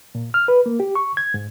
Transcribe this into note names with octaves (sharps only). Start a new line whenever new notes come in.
A#2
F6
B4
A#3
G4
C#6
G#6
G#2